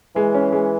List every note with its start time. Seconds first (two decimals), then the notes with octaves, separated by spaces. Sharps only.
0.16 E3 G#3
0.34 C#4
0.52 G#3